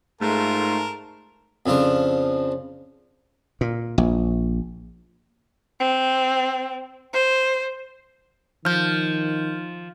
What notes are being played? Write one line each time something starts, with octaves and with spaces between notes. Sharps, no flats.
G#2 A3 F4 A#4 A5
F2 C#3 F3 D4
A#2
A#1
C4
C5
D#3 F3 F6 G6